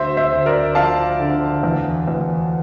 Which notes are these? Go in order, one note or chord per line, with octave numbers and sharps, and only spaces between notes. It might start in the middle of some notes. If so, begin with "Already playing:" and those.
Already playing: D2 C5 E5
C5 E5
D2
A#4 D5
F3 F5 A5
D3
E2
E2